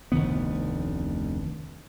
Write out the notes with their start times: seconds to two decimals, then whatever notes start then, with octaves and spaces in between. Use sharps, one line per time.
0.12 F1 D2 D#3 B3